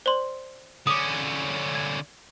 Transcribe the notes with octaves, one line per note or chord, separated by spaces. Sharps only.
C5 D5 C6
D3 C#4 D6 D#6
G#6